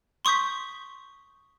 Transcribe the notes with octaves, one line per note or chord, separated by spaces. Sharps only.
C6 C#6 D#6 G6 B6